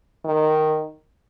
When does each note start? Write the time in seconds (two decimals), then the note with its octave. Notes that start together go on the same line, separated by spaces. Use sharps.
0.25 D#3